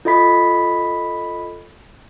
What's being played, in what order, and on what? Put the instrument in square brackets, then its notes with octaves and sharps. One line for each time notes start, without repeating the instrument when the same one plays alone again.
[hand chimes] F4 A4 D#5 B5 B6